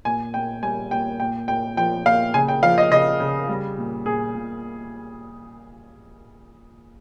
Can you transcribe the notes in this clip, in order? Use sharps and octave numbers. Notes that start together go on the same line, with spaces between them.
A#2 G#5
A#2 G5
G3 G#5
A#2 G5
A#2 G5
A#2 G5
F3 G5
A#2 F5
C#3 G#5
G5
F3 F5
D#5
C#3 D#5
C#3
G3
A#2
A#2 G#4
A#2